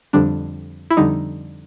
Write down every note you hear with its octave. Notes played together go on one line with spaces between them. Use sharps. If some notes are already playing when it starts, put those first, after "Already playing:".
F2 D3 G3 D4
E4
F2 D3 G3 D#4